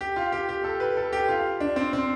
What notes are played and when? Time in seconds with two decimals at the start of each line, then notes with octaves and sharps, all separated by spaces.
0.01 G4
0.16 F4
0.32 G4
0.49 G4
0.64 A4
0.80 B4
0.97 A4
1.13 G4
1.28 F4
1.60 D4
1.76 C4
1.93 C4